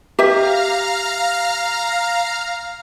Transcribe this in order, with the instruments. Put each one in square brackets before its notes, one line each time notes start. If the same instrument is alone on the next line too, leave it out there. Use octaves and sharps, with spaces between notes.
[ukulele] G4 E5 [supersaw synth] F5 A#5 F6